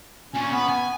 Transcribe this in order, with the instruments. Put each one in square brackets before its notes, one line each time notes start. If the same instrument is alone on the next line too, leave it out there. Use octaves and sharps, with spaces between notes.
[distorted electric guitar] A#2 [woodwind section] C#4
[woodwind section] B3 [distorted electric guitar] B4
[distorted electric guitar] G#5